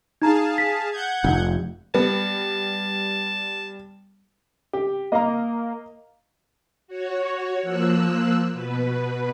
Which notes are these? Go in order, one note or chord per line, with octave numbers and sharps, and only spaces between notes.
D#4 G#4 F5 A5 A#5
B6
F#5 G6 G#6
F1
G3 B3 A5
G4
A#3 D#5 F5 A#5
F#4 C#5
F3 A#3 E6 F#6
B2 B4